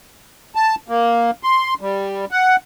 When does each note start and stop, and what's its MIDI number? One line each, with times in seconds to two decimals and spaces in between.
0.55 0.75 81
0.88 1.31 58
1.43 1.74 84
1.81 2.25 55
2.31 2.56 78